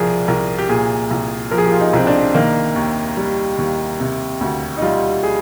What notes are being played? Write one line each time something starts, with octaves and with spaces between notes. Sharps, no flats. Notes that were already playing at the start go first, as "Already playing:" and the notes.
Already playing: C2 F3 G#4 A#4 D5
C2 A#4
G4
A#2 G#4
C2
F3 A#4
G#4
G4
F4
D#4
C2 C4
D4
D#3 A#3
D#2
G3
D#2
C3
D2
D#4
G3 F4
G#4